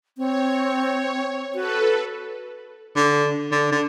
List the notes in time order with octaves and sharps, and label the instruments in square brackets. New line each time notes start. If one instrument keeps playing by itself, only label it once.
[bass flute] C4 [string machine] C#5
[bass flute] F#4 [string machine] A4 B4
[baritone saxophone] D3
D3
D3